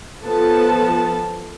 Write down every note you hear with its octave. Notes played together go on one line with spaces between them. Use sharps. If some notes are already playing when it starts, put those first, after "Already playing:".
F3 B3 A4 A5